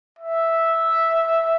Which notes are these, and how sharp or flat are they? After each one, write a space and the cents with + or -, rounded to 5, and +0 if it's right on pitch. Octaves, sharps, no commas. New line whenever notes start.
E5 -5